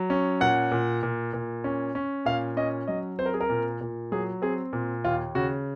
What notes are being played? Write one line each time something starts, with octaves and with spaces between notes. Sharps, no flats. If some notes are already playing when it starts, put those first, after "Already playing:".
Already playing: F#3
C#4
A#2 F#5
A#2
A#2
A#2
C#4
C#4
A#2 F5
C#4 D#5
F#3 D#5
C4 C5
A#4
G#4
A#4
A#2
A#2
F#3 G#4
C4 G#4
A#2
D#2 F4
C#3 F#4